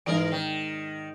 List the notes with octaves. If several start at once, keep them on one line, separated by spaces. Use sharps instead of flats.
G#2 E3 A#4 D5 D#5 D7
D#3